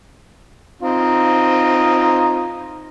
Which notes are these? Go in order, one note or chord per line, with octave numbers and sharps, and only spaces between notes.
C4 D#4 F4